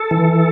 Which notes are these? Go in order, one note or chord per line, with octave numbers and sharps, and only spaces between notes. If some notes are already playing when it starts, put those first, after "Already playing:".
Already playing: A4
E3